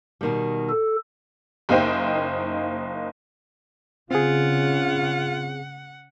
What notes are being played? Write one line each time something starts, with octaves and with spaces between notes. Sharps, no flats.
B2 D#3 G3
A4
F#1 A#3 D#4 C5 G5
C#3 C4 F4 G#4 F#5